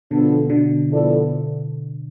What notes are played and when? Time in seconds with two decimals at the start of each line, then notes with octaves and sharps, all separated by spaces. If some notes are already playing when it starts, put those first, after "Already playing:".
0.11 B2 D3 F3 B3 D4 A4
0.50 B2 D3
0.89 F3 B3 E4 A4 D5